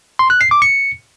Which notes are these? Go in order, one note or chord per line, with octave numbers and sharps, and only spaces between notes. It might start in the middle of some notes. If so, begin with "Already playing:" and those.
C6
F#6
C7
D6
C#7